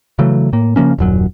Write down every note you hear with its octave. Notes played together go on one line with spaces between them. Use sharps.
C#3 E3 F#3 A3
A2 A#3
C#3 F3 A#3 C#4
D#1 F#2 F#3